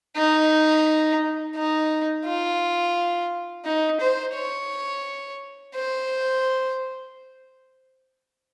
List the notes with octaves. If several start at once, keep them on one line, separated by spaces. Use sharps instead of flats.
D#4
D#4
F4
D#4
C5
C#5
C5